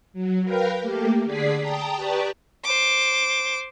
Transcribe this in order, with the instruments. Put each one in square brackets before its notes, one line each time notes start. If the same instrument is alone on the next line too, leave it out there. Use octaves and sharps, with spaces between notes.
[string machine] F#3
A#4 B4 F5 G5
A3 A#3 G4
D3 G#4 D5 B6 C7
G5 A5 A#5 D#6
G4 B4 D5 A5 A#5 C#6
[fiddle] C5 D6